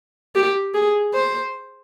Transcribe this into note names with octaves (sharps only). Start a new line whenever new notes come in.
G4
G#4
C5